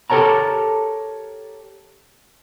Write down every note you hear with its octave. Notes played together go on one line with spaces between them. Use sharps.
G4 A4 A#4 C#5 A5 A#5